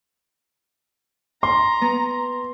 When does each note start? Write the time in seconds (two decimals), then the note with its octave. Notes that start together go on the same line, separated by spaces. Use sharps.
1.43 A#5 C6
1.81 B3